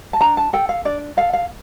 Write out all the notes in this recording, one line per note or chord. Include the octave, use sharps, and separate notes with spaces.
A5
D4 A#5
A5
A4 G5
F5
D4 D5
A4 F5
F5